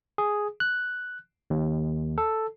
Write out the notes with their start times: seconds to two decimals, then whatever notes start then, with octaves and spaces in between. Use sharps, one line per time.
0.18 G#4
0.60 F#6
1.50 D#2
2.18 A4